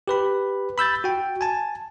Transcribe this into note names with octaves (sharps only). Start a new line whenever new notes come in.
G4 B4 B5
B5 E6 G6 A6
F#4 G5
G#5 A5